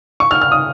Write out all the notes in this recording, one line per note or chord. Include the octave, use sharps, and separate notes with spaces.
C#6
F6
F6
D#6